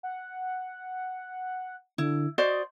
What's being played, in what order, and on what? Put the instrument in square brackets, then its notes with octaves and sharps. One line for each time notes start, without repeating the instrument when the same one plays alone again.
[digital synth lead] F#5
[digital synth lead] D3 [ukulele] E4
[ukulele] F#4 C5 D5 [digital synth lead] D#5